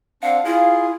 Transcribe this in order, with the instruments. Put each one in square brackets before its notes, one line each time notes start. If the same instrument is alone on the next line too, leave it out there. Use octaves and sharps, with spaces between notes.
[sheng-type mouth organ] C4 D4 [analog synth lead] F5 [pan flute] F#5
[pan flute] E4 [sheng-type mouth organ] F4 G#4